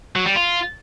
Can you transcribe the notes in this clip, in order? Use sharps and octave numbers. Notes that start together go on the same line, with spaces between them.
F#3
G3
F4